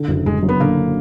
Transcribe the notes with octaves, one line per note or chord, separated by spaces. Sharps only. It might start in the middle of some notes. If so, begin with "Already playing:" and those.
Already playing: D3
F#1
F#1 G#3
F#2
B3
D3 A#3